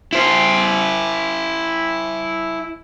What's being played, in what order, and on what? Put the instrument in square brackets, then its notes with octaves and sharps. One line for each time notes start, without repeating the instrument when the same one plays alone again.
[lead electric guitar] E4 C5